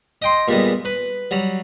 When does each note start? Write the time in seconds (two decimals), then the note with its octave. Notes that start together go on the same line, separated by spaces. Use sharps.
0.22 D#5 G5 C6
0.48 A#2 G3 G#3 B3
0.85 B4
1.31 F#3 G3